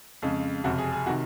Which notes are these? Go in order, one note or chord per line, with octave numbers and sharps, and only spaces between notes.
F2 C#3 G#3
F#1 F2 C3 F#4
G#4
G#4
C3 D#3 F#4